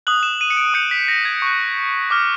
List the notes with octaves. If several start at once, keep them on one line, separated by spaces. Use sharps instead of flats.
D#6 F#6 F#7
E7
D#7
C#7
D7
D#6 G6 C#7
B6
A#6
G#6
C#6 F#6
D6 F6